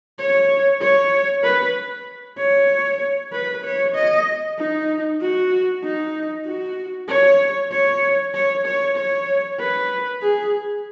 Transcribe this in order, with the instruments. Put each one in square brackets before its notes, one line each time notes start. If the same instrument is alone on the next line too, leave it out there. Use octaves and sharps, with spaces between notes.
[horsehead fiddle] C#5
C#5
B4
C#5
B4
C#5
D#5
D#4
F#4
D#4
F#4
C#5
C#5
C#5
C#5
C#5
B4
G#4